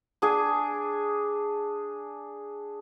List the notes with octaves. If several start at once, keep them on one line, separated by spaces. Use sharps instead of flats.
D4 G#4 G#5